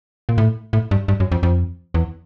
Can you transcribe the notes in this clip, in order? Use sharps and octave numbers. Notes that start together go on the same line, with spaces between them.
A#2
A2
A2
G2
G2
F#2
F2
F2
E2